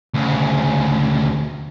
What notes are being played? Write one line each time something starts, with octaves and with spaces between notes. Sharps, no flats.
D2 C#3